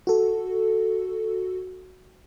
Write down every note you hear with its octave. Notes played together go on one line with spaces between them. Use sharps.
F#4 A4